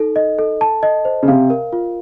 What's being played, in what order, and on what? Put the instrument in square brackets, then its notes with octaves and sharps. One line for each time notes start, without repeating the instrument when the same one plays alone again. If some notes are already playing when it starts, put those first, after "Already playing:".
Already playing: [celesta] D#4 A4
D#5
A4
A5
D#5
C5
[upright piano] C#3
[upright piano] C3 [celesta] F5
[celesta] A#4
F4